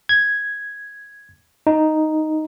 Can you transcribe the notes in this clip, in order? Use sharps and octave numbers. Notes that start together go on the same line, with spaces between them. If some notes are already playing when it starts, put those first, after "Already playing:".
G#6
D#4